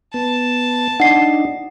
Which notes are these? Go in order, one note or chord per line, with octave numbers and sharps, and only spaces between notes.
B3 A5
D4 D#4 F#5 C7